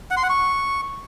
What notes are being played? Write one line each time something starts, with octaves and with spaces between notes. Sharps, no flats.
F#5
C6
F#5
C#6